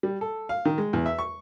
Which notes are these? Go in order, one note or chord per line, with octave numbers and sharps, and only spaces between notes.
G3
A4
F5
D#3
G#3
E2
E5
C#6